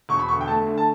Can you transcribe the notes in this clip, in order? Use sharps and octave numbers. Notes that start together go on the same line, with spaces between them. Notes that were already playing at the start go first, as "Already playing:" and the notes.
E1 C#6
B5
D2 C#6
G5
A3 A5
D3
A5